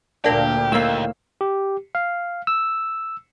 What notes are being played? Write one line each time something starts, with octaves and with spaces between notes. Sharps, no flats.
D2 A#2 A#3 D4 G4
D#2 A2 A#3 E6
G4
F5
E6